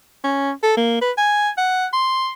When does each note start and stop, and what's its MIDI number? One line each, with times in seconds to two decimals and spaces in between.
0.24 0.51 61
0.63 0.76 69
0.77 0.98 58
1.01 1.11 71
1.17 1.49 80
1.58 1.87 78
1.93 2.31 84